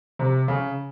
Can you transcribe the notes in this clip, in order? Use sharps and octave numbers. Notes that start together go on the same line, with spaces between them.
C3
C#3